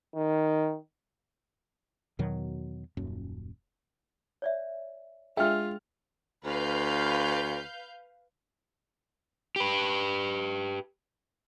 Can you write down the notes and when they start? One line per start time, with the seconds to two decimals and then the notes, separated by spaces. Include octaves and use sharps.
0.15 D#3
2.19 E2 B2 D#3 F#3
2.97 D#1 F#2
4.42 C#5 D5 E5
5.37 G#3 D4 F4 G#4 E5 G5 F6
6.45 D2 B4 F5 G6
9.56 G4 B4